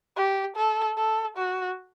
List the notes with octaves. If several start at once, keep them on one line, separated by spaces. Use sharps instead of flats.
G4
A4
A4
F#4